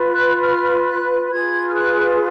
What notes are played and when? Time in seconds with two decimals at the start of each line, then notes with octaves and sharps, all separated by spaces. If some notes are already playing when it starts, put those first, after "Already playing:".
Already playing: F4 B4
0.11 F#6
0.41 F6
0.86 F#6
1.31 F4 G#4 B4 G#6
1.69 F6
1.76 F#6